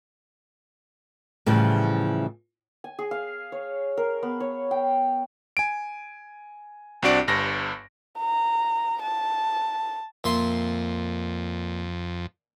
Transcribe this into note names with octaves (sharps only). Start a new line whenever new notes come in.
A2 C#3 E3 F3 G3
G#5
G#4
F5
C#5
A#4
B3
C#5
G5
G#5 D7
C2 C4 D4 F#4 D5 D7
G1 G2 A#6
A#5
A5
F2 A#2 E5 C6